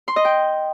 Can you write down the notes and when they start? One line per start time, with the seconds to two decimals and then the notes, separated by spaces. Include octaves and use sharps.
0.08 C6
0.16 D#5
0.25 G5